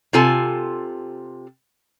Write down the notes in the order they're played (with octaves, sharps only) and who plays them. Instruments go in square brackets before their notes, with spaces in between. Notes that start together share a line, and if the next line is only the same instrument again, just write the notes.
[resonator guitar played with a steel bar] C3 F4 A4 G#5